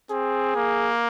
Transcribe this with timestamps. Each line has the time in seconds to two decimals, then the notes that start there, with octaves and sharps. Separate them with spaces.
0.10 C4 G#4
0.56 A#3